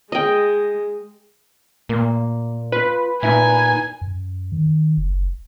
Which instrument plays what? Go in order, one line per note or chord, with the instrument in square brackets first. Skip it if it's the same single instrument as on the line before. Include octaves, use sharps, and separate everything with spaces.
[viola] G#3 [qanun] D#5 G5
[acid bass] A#2 [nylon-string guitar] A#3
[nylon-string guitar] F4 [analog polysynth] B4
[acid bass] A#2 [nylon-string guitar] D#4 E4 E5 [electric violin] G#5
[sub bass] F#2
D#3
F#1